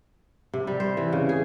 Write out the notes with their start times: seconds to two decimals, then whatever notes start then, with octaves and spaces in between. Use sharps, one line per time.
0.54 C3
0.67 G3
0.80 C5
0.97 E3
1.13 C#3
1.29 G#4